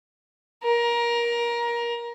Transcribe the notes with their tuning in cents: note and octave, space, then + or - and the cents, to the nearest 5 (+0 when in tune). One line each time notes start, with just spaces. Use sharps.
A#4 +20